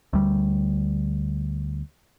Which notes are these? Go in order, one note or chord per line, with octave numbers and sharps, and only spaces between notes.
D2 G3